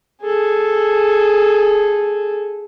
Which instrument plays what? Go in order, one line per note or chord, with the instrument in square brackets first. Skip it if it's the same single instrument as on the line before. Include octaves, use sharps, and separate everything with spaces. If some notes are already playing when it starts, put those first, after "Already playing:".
[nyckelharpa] G#4 A4